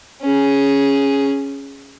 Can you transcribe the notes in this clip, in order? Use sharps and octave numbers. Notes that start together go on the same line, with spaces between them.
C#4 G#4